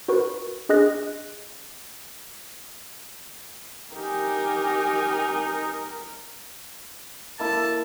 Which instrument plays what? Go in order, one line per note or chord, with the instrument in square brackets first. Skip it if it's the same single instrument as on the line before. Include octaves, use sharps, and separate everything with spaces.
[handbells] F#4 A#4 B4 C#6
D4 G#4 D#5 F#6 A#6
[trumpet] D#4 [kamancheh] G4 G#5 [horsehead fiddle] A#4
[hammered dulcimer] A#3 E4 [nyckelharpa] A5